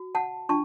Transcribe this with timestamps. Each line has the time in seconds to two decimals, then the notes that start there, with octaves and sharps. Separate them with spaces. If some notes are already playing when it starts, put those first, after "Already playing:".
Already playing: F#4
0.15 F#5 A5
0.49 D4 F4 A5 C#6